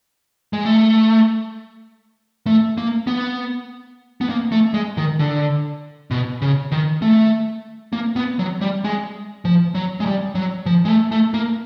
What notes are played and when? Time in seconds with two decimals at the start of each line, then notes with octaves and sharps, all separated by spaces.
0.53 G#3
0.65 A3
2.47 A3
2.78 A#3
3.07 B3
4.21 B3
4.30 A#3
4.52 A3
4.74 G#3
4.97 D#3
5.19 D3
6.11 B2
6.42 C#3
6.72 D#3
7.02 A3
7.93 A#3
8.16 B3
8.39 F#3
8.61 G3
8.84 G#3
9.45 F3
9.75 F#3
10.00 G#3
10.06 G3
10.35 F#3
10.66 F3
10.85 G#3
10.88 A3
11.12 A3
11.34 A#3